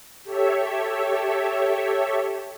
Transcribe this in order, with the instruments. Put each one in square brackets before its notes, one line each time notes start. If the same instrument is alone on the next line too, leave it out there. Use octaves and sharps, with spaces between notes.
[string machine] G4 A4 C#5 E5